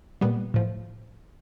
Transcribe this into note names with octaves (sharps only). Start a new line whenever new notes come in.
A#2 G3 B3
A2 F3